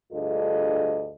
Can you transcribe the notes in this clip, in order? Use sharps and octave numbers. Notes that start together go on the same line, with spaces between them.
D2 G2 F4 G#4 A4 D#5